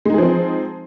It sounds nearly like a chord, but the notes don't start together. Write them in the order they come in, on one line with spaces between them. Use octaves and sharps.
G#3 D#4 G#4 F3 C4